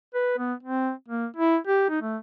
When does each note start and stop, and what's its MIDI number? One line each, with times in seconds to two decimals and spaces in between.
0.14 0.37 71
0.38 0.54 59
0.63 0.91 60
1.08 1.26 58
1.37 1.57 64
1.67 1.84 67
1.89 2.01 63
2.02 2.17 57